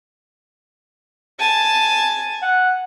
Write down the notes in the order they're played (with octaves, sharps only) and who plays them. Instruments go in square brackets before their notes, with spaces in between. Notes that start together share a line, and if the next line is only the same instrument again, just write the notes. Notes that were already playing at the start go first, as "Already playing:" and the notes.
[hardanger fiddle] G#5 A5
[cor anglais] F#5